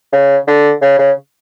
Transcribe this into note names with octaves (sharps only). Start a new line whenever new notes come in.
C#3
D3
C#3
C#3